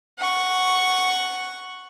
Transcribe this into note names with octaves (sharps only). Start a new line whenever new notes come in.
F#5 C#6